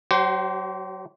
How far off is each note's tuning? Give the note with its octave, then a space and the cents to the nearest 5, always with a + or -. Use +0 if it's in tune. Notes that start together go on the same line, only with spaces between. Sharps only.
F#3 +20 G4 -40 C5 +0